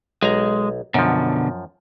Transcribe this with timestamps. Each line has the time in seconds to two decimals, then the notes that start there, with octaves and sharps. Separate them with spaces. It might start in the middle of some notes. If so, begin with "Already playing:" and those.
0.23 B1 G#3 A#5
0.94 F#2 B2 D3 F3